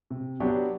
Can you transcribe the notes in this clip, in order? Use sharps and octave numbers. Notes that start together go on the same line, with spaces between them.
C3
F#3 B3 D4 G4